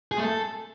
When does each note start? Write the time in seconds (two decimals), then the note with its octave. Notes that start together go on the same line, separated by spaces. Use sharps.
0.12 G#4
0.18 A3
0.24 A4